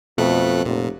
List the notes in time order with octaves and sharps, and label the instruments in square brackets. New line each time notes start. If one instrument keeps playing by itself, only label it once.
[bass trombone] F2 [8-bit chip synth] B2 A3 F#6
[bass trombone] F1 [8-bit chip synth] A#2